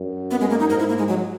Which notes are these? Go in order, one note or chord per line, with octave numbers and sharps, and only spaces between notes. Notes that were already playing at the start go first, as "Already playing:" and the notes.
Already playing: F#2
B3
G#3
A#3
D#4
G#2 A#4
E4
A#3
G#3
F#3